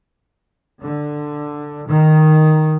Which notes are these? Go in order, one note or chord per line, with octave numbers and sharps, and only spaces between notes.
D3
D#3